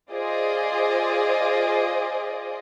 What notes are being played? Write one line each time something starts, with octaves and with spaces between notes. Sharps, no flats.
F4 G#4 C5 D5 D#5